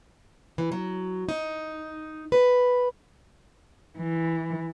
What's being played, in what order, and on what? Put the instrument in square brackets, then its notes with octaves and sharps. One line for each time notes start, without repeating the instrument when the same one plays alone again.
[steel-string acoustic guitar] E3
F#3
D#4
B4
[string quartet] E3